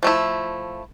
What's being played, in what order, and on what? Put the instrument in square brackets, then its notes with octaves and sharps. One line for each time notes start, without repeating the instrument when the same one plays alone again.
[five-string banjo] F3 A3 E4